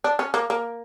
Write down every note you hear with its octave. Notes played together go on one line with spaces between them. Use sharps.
D4
C#4
A#3
A#3